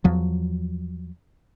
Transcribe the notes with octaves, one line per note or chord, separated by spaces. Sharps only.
E2 F3 F#3